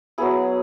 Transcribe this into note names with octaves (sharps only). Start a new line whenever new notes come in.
F#3 B3 E4 G#4